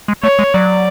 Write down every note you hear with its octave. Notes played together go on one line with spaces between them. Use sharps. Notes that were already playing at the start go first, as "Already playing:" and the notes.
G#3
A3 C#5
G#3
F#3 D5